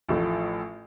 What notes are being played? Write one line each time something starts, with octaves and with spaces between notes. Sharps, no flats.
A1 A2 F3 A3